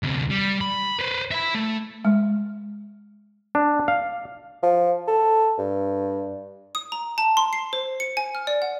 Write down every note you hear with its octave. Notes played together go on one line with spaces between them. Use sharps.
D2 C3
G3
B5
B4 C5
E5 B5
A3
G#3
D4
F5
F3
A4
G2
D#6
A#5
A5
C6
C7
C5
C#7
G#5
F6
D5
F#5